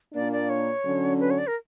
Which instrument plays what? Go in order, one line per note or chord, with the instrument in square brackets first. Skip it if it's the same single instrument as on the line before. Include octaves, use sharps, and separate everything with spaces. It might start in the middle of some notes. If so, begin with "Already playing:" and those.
[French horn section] A#2 A#3 D4 [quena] D5
[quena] D5
C#5
[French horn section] D3 F#3 C#4
[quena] B4
C#5
D5
A#4